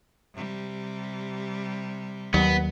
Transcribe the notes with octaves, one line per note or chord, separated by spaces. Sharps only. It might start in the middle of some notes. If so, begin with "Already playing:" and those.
C3 G3
D#2 F#3 B3